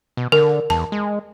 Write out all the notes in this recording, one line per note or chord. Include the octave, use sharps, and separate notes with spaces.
B2
D3 A#4
E2 A5
G#3